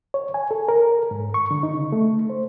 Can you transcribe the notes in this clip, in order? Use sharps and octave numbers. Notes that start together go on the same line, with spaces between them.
C#5
G#5
A4
A#4
G#2
C#6
D3
D#4
C#3
A3
C5